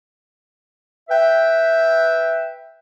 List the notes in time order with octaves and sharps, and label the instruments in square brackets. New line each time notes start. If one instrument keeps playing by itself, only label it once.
[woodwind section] B4 E5 G5